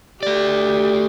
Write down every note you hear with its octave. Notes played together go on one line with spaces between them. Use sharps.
A3 G4 D5